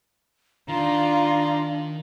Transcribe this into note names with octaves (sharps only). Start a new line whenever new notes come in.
D#3 D4 F4 A#5